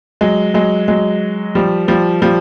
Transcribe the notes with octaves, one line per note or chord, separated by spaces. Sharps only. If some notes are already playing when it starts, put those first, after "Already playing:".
F#3 G#3
F#3 G#3
F#3 G#3
F3 G3
F3 G3
F3 G3